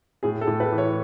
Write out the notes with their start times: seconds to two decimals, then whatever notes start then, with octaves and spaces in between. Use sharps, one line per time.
0.23 A2 G#4
0.41 A4
0.47 A2
0.60 B4
0.72 E3
0.78 C#5